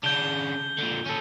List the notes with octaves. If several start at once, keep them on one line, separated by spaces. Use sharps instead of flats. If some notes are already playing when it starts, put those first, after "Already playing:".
C#3 D4 G6 G7
A#2 D3
C#4 A4